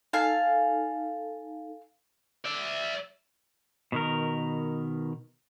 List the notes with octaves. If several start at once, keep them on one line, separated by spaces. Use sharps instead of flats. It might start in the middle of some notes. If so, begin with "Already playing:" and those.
D#4 A4 F5 G#5 A5
D5 E5
B2 D#3 A#4